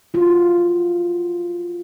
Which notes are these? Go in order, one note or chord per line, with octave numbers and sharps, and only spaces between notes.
F4 F#4